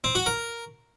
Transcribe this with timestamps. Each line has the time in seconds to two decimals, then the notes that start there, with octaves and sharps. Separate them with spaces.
0.04 C4
0.15 F#4
0.26 A#4